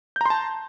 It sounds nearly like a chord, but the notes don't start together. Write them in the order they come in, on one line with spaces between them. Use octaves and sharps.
G6 A#5 C6 A5